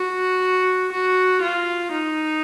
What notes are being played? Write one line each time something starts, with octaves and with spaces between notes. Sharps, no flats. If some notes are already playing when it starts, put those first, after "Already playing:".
Already playing: F#4
F#4
F4
D#4